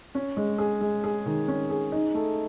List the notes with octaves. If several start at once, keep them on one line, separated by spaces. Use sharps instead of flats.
C#4
G#3
G#4
G#3
G#4
D#3
C#4
G#4
D#4
A3